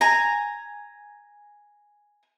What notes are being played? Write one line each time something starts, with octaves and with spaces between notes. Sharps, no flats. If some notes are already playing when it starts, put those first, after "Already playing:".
G#5 A#5